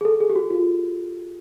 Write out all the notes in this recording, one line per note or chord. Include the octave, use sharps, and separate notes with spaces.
G#4
A4
G#4
G4
F#4
F4